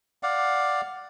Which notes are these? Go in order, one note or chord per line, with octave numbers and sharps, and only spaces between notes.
D5 F5 F#5